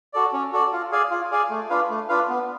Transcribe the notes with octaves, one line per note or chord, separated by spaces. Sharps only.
F#4 A4 D5
C#4
F#4 A4 D5
F4
G#4 D5 F5 G#5
F4
G#4 D5 F5 G#5
A3
D4 F4 B4 F5
A3
D4 F4 B4 F5
B3